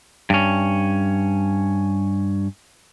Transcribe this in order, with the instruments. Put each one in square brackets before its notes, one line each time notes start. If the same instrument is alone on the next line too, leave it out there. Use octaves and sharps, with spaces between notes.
[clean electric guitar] G2 C#4